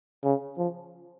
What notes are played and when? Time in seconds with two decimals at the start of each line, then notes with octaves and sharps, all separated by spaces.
0.24 C#3
0.58 F3